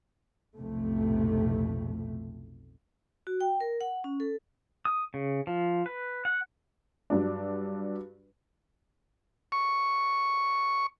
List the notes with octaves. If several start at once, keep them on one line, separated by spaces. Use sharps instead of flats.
B1 F2 A2 C3 A3
F#4
G5
A#4
F#5
C#4
A4
D#6
C#3
F3
B4
F#5
G2 F#3 D4
C#6